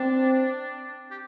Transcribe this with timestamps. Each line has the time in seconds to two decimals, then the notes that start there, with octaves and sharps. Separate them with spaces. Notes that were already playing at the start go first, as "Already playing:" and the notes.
Already playing: C4 D4
1.11 G4